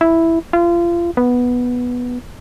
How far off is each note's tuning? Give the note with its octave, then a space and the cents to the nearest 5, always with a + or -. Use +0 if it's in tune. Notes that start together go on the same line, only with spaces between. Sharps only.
E4 +0
F4 -30
B3 -5